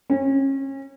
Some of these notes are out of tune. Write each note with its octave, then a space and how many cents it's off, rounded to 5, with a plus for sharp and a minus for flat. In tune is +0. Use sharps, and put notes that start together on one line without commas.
C#4 -35